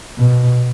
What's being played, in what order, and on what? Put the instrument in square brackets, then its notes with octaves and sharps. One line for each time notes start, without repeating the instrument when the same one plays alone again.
[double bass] B2